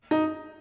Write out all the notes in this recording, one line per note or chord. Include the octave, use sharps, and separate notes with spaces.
D#4